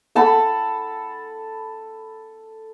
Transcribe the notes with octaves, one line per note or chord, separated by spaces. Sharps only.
A4 A5 B5